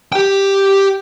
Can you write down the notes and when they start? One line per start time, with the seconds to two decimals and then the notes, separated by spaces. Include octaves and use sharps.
0.13 G4 G5